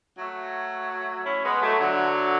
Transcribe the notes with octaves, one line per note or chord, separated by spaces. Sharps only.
F#3 A3
C#4 E4
G#3 B3
F#3 A3
D3 F#3